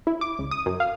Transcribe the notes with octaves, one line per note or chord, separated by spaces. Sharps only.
E4
D6
C#2
D#6
F#2
F5